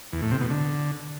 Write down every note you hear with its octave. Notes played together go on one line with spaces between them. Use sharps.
E2
A2
C3
B2
D3